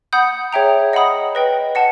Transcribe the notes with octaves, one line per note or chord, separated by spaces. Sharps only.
F#5 B5 D#6 G6
G#4 C#5 E5 G5 A#5
D#5 F#5 B5 D#6
B4 D#5 G5
D#5 F#5 A5